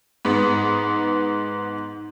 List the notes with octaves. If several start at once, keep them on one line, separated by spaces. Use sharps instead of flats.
G#2 B3